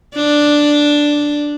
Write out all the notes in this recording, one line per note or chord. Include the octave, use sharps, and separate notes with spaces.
D4